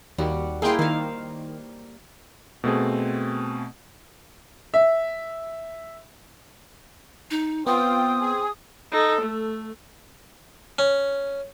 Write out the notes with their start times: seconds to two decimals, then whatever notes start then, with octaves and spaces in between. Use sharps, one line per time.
0.18 D#2 G3 F#4
0.62 A#3 E4 G#4 G5 C6
0.79 D#3 C5 F5
2.64 B2 A3 C4 G#4
4.74 E5
7.31 D#4
7.67 B3 C4 F4 G5 D#6
8.20 G#4
8.92 D#4 A4
9.21 A3
10.79 C#4